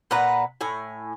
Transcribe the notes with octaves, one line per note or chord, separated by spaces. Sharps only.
A#2 B4 F#5 A#5
A2 G#5